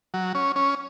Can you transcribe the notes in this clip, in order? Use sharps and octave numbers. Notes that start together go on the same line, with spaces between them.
F#3
C#4
C#4